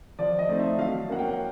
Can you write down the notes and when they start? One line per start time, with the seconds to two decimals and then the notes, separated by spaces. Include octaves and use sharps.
0.19 F3 D5
0.39 D#5
0.49 A3 C4 D#4
0.59 E5
0.78 F#3 F5
1.09 A#3 C#4 F#5
1.19 G5